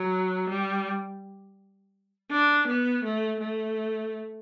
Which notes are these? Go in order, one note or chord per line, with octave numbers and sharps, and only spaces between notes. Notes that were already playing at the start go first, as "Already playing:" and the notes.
Already playing: F#3
G3
D4
B3
A3
A3